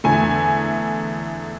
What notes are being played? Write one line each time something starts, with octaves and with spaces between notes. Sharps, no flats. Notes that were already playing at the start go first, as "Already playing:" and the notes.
E2 D3 A3 G#5